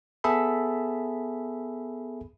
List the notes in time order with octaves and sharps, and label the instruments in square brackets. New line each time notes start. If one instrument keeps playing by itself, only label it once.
[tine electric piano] B3 G#4 A4 E5 B5